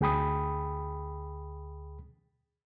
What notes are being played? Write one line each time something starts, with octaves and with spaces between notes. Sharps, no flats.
D2 G#4 G5 B5 D#6